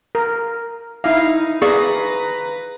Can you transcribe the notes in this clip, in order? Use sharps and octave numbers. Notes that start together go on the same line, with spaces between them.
A#4
D#4 E4 F5
G#4 B4 D5 F5 A#5 C#6